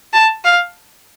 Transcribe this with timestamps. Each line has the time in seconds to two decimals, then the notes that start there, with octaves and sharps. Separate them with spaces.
0.13 A5
0.44 F5